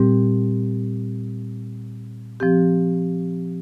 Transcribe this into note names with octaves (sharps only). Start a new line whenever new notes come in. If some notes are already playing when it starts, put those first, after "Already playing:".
Already playing: A#2 G3 C4 G4
F3 C4 G4